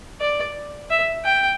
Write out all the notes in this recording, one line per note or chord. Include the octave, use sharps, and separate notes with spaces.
D5
E5
G5